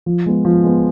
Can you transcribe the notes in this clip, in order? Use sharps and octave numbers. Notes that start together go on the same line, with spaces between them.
F3
G#3 B3
F3
G#3 B3